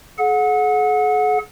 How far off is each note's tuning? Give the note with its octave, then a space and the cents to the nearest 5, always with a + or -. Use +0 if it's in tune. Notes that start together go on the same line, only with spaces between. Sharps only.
G#4 +45 F#5 -25